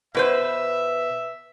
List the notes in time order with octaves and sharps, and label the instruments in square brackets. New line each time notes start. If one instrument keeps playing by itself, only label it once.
[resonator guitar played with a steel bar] B2 B4 C5 [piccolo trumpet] E5